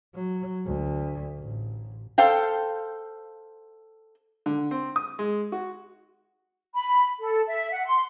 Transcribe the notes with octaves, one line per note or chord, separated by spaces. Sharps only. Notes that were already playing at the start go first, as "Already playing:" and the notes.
F#3
D2
A1
A4 C5 F5 G5
D3
C4
D#6
G#3
F#4
B5
A4
E5
F#5
C6